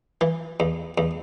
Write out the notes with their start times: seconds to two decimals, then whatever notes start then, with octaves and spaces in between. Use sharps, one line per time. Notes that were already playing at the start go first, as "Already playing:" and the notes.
0.21 E3
0.60 E2
0.98 E2